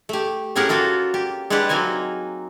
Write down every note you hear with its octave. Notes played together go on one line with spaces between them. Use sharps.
A3 G4
A2 C#4 G4 G#4 A#4 F#5
A#3 F4 F#4 A4
G4
G#3 D4 E4 G4 B4 F#5
F#3 A#3 C4 D#4 G#5